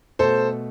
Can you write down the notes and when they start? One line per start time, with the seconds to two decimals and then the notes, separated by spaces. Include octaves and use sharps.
0.19 B2 A3 A4 C5